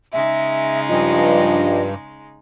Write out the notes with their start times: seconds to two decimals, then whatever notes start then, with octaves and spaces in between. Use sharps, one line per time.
0.13 C#3 G#3 D#4 E5
0.89 G2 F3 D#5